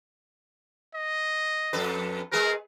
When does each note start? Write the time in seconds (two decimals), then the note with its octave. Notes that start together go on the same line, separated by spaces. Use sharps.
0.94 D#5
1.73 F2 A4 B4
2.32 G#3 G#4 A#4 B4